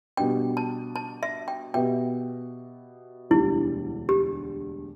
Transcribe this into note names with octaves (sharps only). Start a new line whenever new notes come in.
B2 G3 D4 G5
A5
A5
E5
G5
B2 B3 G4 E5 G5
E1 D2 D3 G3 D4 E4
G4